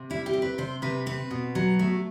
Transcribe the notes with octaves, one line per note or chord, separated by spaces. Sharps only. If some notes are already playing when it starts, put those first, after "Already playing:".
Already playing: C3
G3 E4
G4
C4
B4
C3 C5
C3 B4
C4 B4
B2
F#3
A3